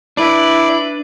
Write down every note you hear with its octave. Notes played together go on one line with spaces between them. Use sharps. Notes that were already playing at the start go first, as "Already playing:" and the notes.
D4 E4 B4 D5